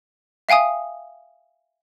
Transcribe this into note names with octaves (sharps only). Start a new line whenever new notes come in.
E5 F5 G5 G#5 D#6